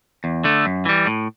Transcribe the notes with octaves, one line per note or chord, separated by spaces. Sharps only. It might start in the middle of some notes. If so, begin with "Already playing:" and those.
E2
D3 A3
F#2
E3 G3
A2